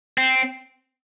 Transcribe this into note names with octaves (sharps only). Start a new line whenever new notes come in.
C4